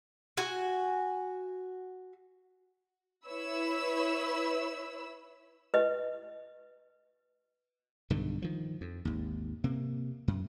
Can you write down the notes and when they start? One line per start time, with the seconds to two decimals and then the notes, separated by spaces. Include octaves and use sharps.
0.37 F#4 G#5
3.26 E4 B4 C#5 B5 E6
5.74 B4 D#5
8.10 B1 G2 D3 D#3
8.42 D#3 F3
8.81 F2
9.05 G#1 D#2
9.64 C3 A#3
10.28 F#2